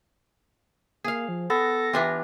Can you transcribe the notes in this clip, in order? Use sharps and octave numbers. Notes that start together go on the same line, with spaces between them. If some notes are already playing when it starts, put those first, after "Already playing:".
A#3 G#4 F5
F3
B3 A4 A#6
E3 D4 F4 G4